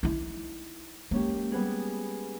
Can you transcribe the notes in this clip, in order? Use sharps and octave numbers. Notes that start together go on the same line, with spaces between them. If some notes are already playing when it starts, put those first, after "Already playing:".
D#4 E4
G#3 A#3 C#4 G4
G3 B3 G#4